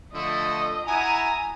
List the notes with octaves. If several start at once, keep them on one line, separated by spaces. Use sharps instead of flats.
D3 F3 A3 D#5
E4 F#4 G#5 A#5 D#6